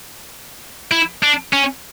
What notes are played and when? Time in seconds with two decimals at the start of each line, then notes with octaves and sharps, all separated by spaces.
0.91 E4
1.23 D4
1.53 C#4